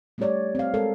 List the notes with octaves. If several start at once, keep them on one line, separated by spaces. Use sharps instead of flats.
G3 A3 C#4 G4 C#5 D5
C4 F5
G#3 A4 A#4